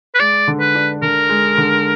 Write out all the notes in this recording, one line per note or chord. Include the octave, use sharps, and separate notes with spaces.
B4
G#3 D5
D3
B4
D4
D3 A#4
G#3
D3